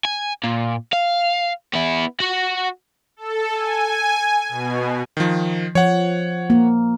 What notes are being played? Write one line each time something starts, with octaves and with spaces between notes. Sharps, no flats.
G#5
A#2
F5
B3 E4
F#4 F#5
A4
G#5
B2
D#3 F3
F3 C#5 F#5
A#3